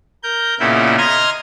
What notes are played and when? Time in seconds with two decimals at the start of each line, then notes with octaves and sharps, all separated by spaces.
0.23 A#4 G6
0.60 A#2 C#3 B3 D#4 E4
0.98 D#5 A#5 C6 F6 G#6 A#6